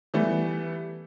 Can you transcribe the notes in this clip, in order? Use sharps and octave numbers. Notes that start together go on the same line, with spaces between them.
E3 G3 A3 B3